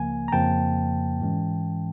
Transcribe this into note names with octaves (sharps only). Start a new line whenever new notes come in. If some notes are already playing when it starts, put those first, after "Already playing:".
Already playing: C#2 C#3 F3 A#3 G#5
A#5
F2 C#3 F3 A#3 G5 A5
G#2 E3 G#3 C#4